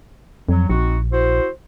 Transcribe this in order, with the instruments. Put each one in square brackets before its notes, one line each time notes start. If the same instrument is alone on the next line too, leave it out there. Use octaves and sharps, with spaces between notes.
[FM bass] F2 [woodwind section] F#3
[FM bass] A#1 [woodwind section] C4 D#4 F#4
[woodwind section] E4 F#4 C5